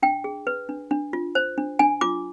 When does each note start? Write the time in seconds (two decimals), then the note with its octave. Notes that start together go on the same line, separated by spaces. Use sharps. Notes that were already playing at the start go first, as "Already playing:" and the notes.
0.02 D4 G5
0.24 G#4
0.47 B4
0.69 D4
0.91 D4
1.13 F4
1.35 C5
1.58 D4
1.79 D4 G#5
2.01 F4 D6